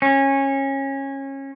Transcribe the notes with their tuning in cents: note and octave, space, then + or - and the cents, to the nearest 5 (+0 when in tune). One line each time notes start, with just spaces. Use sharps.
C#4 -20